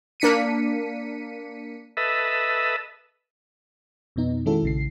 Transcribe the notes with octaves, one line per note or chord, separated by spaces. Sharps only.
A#3 D4 B6 C#7 D#7
A4 B4 D#5 E5
F2 B2 B3 D#4
D#3 G#3 C#4 E4 F#4 A4
A#1 C#3 C7